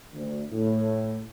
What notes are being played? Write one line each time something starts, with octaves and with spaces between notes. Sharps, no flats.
D2
A2